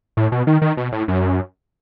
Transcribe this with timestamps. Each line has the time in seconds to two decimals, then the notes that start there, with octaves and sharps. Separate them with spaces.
0.17 A2
0.32 B2
0.47 D#3
0.62 D#3
0.77 B2
0.92 A2
1.08 F#2